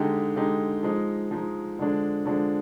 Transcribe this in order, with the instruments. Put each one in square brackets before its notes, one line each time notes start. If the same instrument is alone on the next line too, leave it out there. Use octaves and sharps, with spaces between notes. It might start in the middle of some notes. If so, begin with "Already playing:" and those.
Already playing: [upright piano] D3 G#3 D#4 G4
D3 G#3 D#4 G4
F3 G#3 D#4
F3 G#3 D#4
D3 F3 G#3 D4
D3 F3 G#3 D4